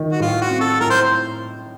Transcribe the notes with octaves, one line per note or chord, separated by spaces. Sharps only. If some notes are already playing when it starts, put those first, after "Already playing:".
Already playing: D#3
F#4
A2 F4
F#4
C4
A4
A2 A#4
C5